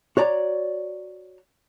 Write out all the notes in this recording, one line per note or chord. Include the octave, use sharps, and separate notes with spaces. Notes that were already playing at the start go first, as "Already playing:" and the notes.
F#4 C#5 D5 A#5